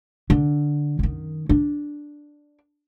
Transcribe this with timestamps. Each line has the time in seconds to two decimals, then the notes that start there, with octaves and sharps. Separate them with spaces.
0.30 D3
0.99 F#2 D#3
1.49 D4